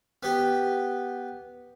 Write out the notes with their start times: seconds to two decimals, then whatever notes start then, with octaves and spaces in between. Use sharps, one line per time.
0.23 B3 G4